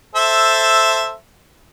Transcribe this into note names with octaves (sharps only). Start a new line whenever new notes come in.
A4 C5 E5